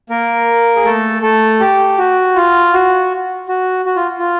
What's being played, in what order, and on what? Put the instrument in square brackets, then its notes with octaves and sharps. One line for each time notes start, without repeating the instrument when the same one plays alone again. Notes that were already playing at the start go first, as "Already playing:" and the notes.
[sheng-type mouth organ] A#3 A#4
G#4
A3 A4
A3 A4
G4
F#4
F4
F#4
F#4
F#4
F4
F4